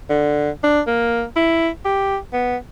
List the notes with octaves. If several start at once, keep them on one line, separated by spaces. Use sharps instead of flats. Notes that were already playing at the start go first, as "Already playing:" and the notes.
D3
D4
A#3
E4
G4
B3